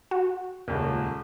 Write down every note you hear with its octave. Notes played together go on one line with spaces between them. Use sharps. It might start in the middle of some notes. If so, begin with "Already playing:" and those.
F#4
D#1 C#2 A#2